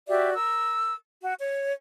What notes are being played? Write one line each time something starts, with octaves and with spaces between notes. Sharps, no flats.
F#4 G4 D5 E5
A#4 E6
F#4
C#5